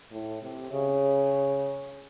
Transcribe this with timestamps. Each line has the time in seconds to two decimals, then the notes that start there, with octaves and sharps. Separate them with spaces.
0.11 A2
0.42 C3
0.72 C#3